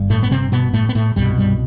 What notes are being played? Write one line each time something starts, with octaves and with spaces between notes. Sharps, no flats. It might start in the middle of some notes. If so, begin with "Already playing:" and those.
Already playing: G1 G2
A2 A3
B3
C3 C4
B2 B3
A2 A3
B3
A2 A3
C2 G2 B2 G3
G2 G3